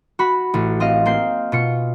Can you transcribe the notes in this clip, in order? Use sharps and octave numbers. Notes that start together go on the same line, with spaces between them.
F#4 B5
A1
C4 D#5 F5
A#3 C4 G6 C7
B2 F4 C#7